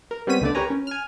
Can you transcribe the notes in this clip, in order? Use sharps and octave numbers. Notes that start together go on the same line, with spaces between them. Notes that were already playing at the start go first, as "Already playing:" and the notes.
A#4
G3 B3 C4 C#5 B6 D#7
C#2 D3 A3 B3 D5
G4 A#4 B4 C#5 G#5 A#5
C#4
G#5 F6